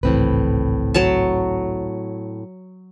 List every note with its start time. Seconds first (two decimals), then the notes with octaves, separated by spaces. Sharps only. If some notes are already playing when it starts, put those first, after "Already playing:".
0.03 G#1 C#2 A2 E3 C4 B4
0.94 F#3 A5